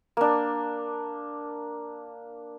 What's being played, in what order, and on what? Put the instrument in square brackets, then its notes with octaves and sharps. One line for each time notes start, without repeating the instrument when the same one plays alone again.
[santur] A#3 D4